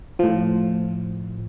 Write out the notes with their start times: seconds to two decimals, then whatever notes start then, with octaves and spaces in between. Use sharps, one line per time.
0.19 A2 F3